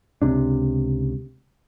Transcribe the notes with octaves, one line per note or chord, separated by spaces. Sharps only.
C#2 C3 D4